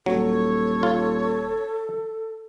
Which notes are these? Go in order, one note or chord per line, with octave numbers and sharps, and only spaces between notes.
D#1 F#3 A4 C#5
F4